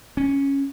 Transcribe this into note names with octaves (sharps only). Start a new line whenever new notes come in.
C#4